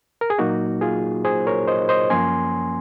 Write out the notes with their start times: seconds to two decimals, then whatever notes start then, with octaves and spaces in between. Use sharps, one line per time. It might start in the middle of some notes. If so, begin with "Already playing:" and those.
0.21 A#4
0.30 G#4
0.38 A#2 F#3 A#3 D#4 F#4
0.81 F4 G#4
1.25 G#4 C5
1.47 A#4 C#5
1.68 C5 D#5
1.89 C5 D#5
2.10 F#2 F3 A#3 C#4 G#5 C6